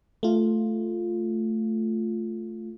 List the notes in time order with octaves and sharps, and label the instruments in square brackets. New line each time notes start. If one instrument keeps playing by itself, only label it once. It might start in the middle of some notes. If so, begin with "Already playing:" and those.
[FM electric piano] A3 F4